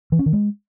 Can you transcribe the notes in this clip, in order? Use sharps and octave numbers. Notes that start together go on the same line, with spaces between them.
E3
C#4
D#3
G#3